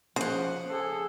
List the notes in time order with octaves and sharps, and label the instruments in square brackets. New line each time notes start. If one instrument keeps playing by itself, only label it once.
[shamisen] C#3 [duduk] F3 [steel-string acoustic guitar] C5 F#5
[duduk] G#4 [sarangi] A4